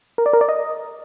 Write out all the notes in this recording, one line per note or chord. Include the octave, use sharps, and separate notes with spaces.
A#4
D5
A#4
D5
D#5